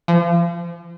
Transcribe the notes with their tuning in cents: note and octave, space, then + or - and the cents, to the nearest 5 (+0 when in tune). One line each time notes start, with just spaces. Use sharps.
F3 -35